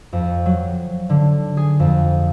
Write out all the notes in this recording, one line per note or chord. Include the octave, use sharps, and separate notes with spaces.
F2
F#3
D3
G#4
F2